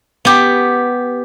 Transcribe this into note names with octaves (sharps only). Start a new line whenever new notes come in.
B3 G4